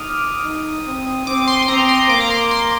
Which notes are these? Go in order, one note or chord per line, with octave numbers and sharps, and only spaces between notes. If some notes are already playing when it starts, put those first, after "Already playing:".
Already playing: D#4 D6 D#6 F6
D#4
C4
C4 D6
C6
C6
C4 A#5
C6
A#3 D6
A#5
C6
C6